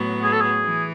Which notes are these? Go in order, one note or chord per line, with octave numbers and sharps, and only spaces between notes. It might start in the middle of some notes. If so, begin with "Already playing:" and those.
Already playing: A2 F#3 B3
G#4
A4
G#4
E3